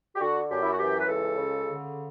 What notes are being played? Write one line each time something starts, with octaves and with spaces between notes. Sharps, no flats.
G4
D3 F#4
F#2 G4
E4
F#4
E3 G4
B4
C#2 A4
C#3
D3